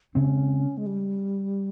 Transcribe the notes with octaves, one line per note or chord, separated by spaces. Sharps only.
C#3 G#3 C4 C#4
G#3
G3